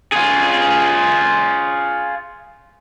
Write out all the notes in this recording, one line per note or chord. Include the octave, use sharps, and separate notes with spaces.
F4 G#4